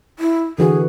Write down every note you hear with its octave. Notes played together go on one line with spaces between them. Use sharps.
E4
D3 E3 F#4 G#4